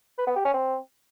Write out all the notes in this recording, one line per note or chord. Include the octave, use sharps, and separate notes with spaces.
B4
B3
G4
C#4
C4